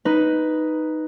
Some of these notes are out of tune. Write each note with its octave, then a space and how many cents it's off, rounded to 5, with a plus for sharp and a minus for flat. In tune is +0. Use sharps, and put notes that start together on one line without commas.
D#4 +0 B4 +0